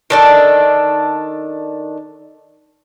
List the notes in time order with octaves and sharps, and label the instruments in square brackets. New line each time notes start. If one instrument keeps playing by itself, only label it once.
[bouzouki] D#3 D4 A4